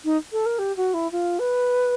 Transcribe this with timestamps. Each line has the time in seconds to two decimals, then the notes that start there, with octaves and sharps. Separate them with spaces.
0.05 D#4
0.32 A4
0.46 A#4
0.59 G4
0.77 F#4
0.94 E4
1.12 F4
1.39 B4